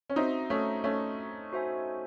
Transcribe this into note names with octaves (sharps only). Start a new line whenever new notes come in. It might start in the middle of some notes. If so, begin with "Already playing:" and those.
C#4
C4 D#4 F#4 C5 E5
A3 C#4
A3 C#4
F#4 C5 E5 G#5